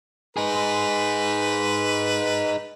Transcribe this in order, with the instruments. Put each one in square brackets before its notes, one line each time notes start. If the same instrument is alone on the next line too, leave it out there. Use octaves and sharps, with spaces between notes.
[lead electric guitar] D#4 G#4 [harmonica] B4